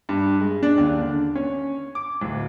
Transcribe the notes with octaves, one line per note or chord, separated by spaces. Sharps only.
G2
G#3
D4
D#2
D3
C#4
D6
D1